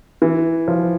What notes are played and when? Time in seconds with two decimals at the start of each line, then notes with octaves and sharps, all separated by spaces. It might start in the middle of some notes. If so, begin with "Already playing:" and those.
0.22 E3
0.68 F3